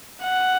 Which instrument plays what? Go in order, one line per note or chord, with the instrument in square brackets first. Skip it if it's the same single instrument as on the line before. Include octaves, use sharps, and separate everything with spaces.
[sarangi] F#5